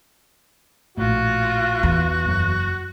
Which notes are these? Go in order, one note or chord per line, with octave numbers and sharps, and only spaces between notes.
A#1 A2 F4 F#4
E2
F#1 F#2 F#3